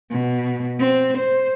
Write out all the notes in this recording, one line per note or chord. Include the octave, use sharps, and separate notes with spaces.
B2
C4
C5